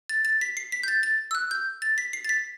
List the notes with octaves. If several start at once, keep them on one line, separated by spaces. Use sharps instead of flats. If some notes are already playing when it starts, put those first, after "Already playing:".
A6
A6
B6
C7
B6
G6
A6
A6
E6
F#6
G6
A6
B6
C7
A6
B6